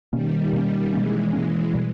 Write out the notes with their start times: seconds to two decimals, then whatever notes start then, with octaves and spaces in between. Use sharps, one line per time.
0.12 B2 D#3 G3 A#3 C#4
0.53 B2 A#3 C#4
0.93 B2 E3 G#3 A#3 C#4
1.33 B2 E3 G#3 A#3 C#4
1.73 B2 G3